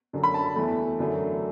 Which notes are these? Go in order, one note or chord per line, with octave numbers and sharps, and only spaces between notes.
F#2 D3 F#3
B5
A5
E2 E3 A3
F#2 D3 F#3 A3